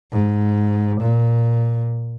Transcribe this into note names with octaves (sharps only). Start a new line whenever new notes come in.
G#2
A#2